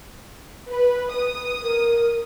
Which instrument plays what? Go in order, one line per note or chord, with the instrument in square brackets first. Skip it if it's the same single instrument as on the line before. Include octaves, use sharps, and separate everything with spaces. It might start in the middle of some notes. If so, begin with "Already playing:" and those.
[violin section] B4
[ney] B4 [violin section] D#6
[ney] A#4